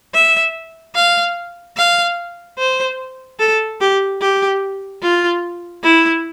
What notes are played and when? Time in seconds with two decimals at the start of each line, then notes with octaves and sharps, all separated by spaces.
0.15 E5
0.96 F5
1.77 F5
2.59 C5
3.40 A4
3.81 G4
4.22 G4
5.02 F4
5.84 E4